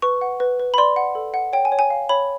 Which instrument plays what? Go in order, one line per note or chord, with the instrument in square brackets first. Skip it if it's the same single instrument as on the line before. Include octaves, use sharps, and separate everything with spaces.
[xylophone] B4 C#6
F#5
B4
B4
B5
D5 C6
F#5
A4
F#5
C#5 G5
G#5
C#5
G#5
F5
C#5 B5